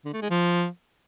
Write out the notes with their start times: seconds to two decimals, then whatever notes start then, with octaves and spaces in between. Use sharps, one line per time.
0.05 D3
0.14 A3
0.22 G#3
0.30 F3